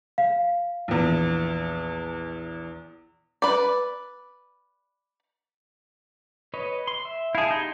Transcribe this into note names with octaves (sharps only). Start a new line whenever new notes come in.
F5
A#1 E2
B4 D5
B4 C#5 D#5
C6
E5
E4 G#4 F5 A5
D#4 G4 C6